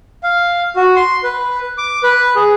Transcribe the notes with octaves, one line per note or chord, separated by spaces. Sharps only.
F5
F#4
C6
B4
D6
B4
G#4